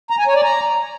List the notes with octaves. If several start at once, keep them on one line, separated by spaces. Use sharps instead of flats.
A#5
G#5
C#5
D5
A#5